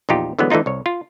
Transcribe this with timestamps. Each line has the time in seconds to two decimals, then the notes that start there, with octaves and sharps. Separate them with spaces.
0.09 A#1 E2 D#4 F4 G4
0.39 D3 E3 F#3 G#3 B3
0.50 E3 A3 D4 D#4 F4
0.66 C2 C#5
0.86 F4